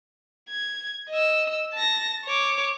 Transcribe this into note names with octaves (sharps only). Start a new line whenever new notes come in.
G#6
D#5 E6
A5 A#6
C#5 D6